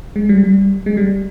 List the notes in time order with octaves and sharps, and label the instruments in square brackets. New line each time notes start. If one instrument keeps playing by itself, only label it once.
[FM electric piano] G#3
G3
G3
G#3
G3